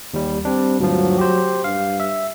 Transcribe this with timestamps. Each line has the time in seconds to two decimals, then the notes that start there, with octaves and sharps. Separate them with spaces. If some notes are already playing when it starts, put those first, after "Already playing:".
0.14 D#2 G3
0.45 G3 C4 D4
0.80 D2 G2 F3 F#3
1.18 G4 C5
1.64 G2 F5
2.00 E5